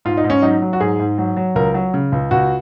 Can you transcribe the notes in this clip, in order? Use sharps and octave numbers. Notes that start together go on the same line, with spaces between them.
G#2 F4
D#4
G#2
C#4
F#3 D#4
F#3
F#4
G#2 G#4
G#2
F#3
F#3
C#2 A#4
F#3
C#3
C#2
C#2 F#4